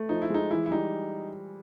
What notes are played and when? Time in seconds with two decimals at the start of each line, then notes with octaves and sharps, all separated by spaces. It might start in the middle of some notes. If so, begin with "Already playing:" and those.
Already playing: A3
0.09 F3 D#4
0.22 E4
0.30 G#3 D#4
0.51 E3 E4
0.66 E4
0.71 G3 D#4